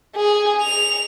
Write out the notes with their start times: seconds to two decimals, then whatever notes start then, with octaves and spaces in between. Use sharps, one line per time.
0.16 G#4
0.62 F7